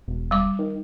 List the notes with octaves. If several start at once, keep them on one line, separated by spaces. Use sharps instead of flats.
E1
G3 D6
D#3